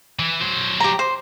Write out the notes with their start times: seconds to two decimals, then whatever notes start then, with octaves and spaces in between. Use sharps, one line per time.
0.19 E3
0.41 F#3 C5
0.80 G4 A#5
0.99 C5